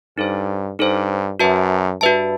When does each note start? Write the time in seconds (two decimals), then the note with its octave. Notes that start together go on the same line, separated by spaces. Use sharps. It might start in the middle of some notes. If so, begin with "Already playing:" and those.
0.18 G2 D#4 A4 C5
0.79 G2 D#4 A4 C5
1.40 F#2 F#4 B4 E5 A5
2.01 G2 F#4 B4 E5 A5